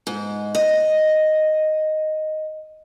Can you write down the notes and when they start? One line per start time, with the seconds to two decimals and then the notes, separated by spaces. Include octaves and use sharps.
0.07 G#2
0.55 D#5